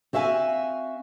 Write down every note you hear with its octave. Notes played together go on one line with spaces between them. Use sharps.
C4 F#4 E5 F5 G#5